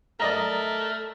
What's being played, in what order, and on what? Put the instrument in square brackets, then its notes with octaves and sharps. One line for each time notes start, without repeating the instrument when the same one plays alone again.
[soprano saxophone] A3 [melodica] A#4 [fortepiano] D5 D#5 A#5